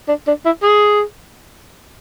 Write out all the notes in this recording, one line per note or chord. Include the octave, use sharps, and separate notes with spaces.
D4
D4
E4
G#4